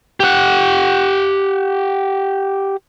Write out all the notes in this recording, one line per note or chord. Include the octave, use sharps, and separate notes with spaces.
G4 F#5